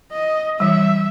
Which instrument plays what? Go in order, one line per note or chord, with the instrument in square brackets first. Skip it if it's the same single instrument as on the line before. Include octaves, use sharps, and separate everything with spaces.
[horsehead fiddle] D#5
[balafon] E3 G3 [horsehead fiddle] E5